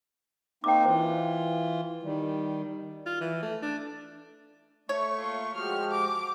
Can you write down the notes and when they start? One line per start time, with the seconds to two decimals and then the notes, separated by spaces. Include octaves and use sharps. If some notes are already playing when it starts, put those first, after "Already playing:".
0.64 A#3 C4 D#4 G5 D6
0.85 E3 F4 C5
2.03 D#3 G3
3.06 F4
3.21 E3
3.43 A3
3.62 D4
4.89 A3 C#5 C#6
5.18 A#3 F4
5.54 F3 G#3 F#4 G4 F6
5.91 D6